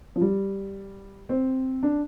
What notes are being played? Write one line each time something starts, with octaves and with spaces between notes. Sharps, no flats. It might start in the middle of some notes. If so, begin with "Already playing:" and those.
F3
G3
C4
D4